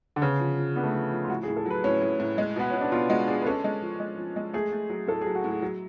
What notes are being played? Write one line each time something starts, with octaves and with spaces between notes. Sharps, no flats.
D3
C#3 B3
F3
F3
B3 D4
A3
F3 B3
F3
F4
A2 F#4
G#4
A2
A4
F#3 B4
A2 C#4
A2
A2
G#3
B2 B3
B2 C#4
D4
B2 F4
G#3 F#4
D4 G#4
B4
C#4 A4
G#3
F3
G#3
F3
G#3
A3 G#4
A3
F#3
A2 A4
G#4
F#3
F#4
A2 G#4
F#3